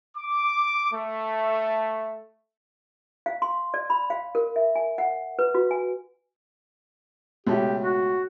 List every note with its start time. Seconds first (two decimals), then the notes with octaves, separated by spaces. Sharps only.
0.18 D6
0.93 A3
3.26 F5
3.42 C6
3.74 D5
3.90 B5
4.10 F5
4.35 A#4
4.56 E5
4.75 G#5
4.98 F#5
5.39 B4
5.55 F#4
5.71 G#5
7.47 C#2 B2 A3 G4
7.81 F#4